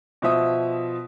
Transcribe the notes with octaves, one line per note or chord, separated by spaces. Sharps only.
B2 F3 C5 E5 D#6